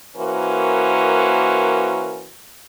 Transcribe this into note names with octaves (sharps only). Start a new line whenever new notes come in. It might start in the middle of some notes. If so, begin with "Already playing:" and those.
E3 A#3 C#4 F#4 A#4 C5